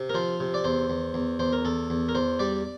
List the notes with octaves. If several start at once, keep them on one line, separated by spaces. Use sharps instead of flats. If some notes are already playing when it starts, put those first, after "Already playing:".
Already playing: C3
A#4
F3 C5
C3
D5
E2 C5
E2
E2
E2 C5
A#4
E2 A4
E2
A#4
E2 C5
G3 D5